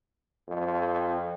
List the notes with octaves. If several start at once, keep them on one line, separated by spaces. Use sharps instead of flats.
F2